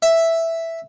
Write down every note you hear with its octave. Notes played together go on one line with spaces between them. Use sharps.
E5